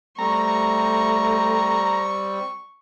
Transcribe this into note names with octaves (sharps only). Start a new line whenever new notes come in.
G3 A3 C4 A#5 C#6